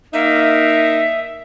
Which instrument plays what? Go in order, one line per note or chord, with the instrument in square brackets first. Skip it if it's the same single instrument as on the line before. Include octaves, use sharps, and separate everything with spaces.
[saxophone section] A#3 D#4 [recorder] E5